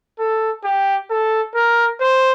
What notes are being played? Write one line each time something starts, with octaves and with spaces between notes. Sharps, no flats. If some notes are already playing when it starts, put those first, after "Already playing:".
A4
G4
A4
A#4
C5